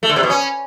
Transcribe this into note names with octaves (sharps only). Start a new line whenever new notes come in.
A3
D3
C3
B2
C#4